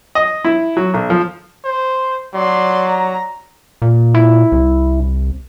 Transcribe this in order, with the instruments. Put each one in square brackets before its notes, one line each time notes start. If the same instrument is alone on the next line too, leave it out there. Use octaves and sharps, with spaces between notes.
[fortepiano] D#5
E4
F#3
B1
F3
[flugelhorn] C5
[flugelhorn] F#3 [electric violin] D5 C6
[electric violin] A#5
[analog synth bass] A#2
[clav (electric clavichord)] E4
[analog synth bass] C2